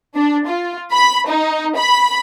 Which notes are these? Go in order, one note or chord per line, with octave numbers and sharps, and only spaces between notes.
D4
F4
B5
D#4
B5